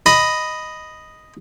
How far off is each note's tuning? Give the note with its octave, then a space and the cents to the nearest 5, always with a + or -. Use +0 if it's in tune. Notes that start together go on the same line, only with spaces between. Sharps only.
D#5 +0 B5 +5